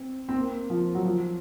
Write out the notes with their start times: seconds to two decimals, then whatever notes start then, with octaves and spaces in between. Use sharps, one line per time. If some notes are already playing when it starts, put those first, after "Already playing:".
Already playing: C4
0.29 C4
0.35 A#3
0.70 F3
0.95 F#3
1.05 F3